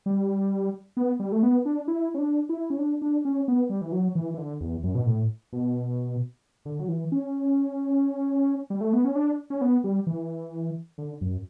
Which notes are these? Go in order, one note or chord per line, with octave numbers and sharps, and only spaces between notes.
G3
B3
G3
A3
B3
D4
E4
C#4
D4
E4
C#4
D4
D4
C#4
B3
G3
E3
F#3
E3
E3
D3
E2
F#2
B2
A2
B2
D3
F#3
E3
C#4
G3
A3
B3
C#4
D4
C#4
B3
G3
E3
D3
F#2